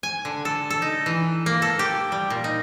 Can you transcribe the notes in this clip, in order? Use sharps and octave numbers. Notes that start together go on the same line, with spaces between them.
G#5
D3
A4
A4
D#4
E3
A#3
A4
G4
G3
A#2
D#4